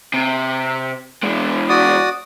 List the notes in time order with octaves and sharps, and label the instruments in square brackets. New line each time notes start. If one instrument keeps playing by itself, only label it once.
[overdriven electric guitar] C3
E2 G#3
[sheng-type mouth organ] F#4 D5 D#6